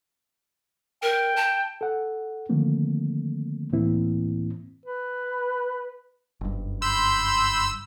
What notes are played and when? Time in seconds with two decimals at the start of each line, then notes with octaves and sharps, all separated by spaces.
1.03 A#4 G5
1.36 A5
1.81 A4 F#5
2.49 D3 D#3 F3 A3 A#3 C4
3.72 C#2 A2 E3 A#3 C4 E4
4.85 B4
6.41 F#1 G2
6.82 B5 C6 E6 G6